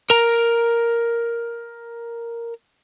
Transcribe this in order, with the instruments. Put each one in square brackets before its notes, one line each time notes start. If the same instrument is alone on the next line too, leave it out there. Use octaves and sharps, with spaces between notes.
[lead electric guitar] A#4 A#5